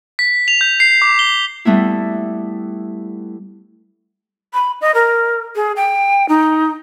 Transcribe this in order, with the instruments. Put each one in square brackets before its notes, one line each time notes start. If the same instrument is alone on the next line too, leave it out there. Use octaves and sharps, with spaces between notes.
[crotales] B6
F7
G6
C7
D6
G7
[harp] G3 A3 B3 E4
[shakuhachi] B5
D#5
A#4
G#4
G5
D#4